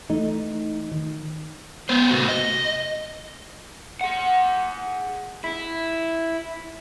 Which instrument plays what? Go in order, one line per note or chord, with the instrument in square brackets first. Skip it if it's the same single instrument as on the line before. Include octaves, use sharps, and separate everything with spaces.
[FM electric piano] E3 A3 D#4
D#3
[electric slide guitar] B3 C5
C3 A3 F#4
D#5
[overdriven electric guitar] G#4 F#5
E4